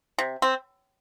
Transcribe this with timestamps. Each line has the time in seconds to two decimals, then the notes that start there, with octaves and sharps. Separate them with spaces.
0.18 C3
0.42 C4